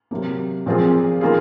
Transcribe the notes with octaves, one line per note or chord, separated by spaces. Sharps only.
C3 F#3 A#3
A#2 F3 C4 F4 G#4
D#3 A#3 F4 G#4